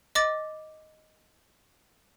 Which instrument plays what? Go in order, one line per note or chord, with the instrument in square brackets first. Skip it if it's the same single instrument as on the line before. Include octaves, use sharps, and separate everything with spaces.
[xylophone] D#5 D6 A6